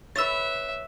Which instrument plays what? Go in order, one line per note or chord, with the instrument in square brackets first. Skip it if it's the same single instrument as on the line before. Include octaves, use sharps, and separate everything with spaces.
[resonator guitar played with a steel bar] B4 C#5 [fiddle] E5 [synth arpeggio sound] E6 A6